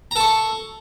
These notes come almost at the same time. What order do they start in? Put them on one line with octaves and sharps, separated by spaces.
A#5 A4 C#6